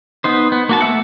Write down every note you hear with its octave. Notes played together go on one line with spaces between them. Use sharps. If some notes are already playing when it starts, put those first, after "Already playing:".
B3 D#4 C5
B3
A#3 F#4 A5
A3 A#3 E5 F#5